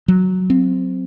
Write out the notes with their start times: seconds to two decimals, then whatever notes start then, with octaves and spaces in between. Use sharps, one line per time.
0.08 F#3
0.50 C4